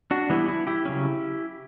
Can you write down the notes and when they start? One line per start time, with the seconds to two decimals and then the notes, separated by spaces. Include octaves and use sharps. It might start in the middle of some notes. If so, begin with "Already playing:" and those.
0.11 D4 F#4
0.30 E3 G3 B3 E4
0.48 E4
0.67 E4 G4
0.85 C#3 F#3 C#4